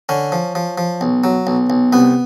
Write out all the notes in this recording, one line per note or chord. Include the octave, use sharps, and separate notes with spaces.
D3 C#4
F3
F3
F3
B1
F#3
B1
B1
C2 B3